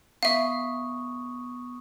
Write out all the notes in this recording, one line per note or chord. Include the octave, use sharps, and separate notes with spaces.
B3 E5 F5 C#6 D#6